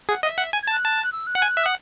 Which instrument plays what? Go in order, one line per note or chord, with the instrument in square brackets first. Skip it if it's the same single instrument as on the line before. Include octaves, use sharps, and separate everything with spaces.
[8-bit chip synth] G#4 [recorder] F#5
[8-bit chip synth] D#5 [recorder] F#5
[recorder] E5
[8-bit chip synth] F#5
G#5
[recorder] G#6
[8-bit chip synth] A5
[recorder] F#6
[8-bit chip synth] A5
[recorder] F#6
E6
F#6
[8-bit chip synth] F#5
G#5
E5
[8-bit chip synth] F#5 [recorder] D#6